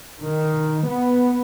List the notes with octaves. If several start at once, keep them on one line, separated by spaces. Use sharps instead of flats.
D#3
B3